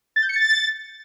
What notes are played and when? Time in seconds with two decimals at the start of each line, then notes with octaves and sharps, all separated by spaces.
0.16 A6
0.23 G6
0.29 C#7
0.36 A6